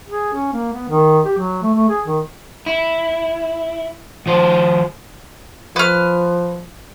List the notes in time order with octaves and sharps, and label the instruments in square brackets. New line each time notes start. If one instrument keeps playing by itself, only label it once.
[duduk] G#4
C#4
A#3
B3
D#3
G4
F#3
A3
A3
G#4
D#3
[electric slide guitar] E4
D#3 F3 C5
[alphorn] F3 [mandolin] B4 F6